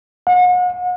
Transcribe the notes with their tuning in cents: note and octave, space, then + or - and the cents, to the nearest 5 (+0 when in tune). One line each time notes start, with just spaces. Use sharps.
F#5 -40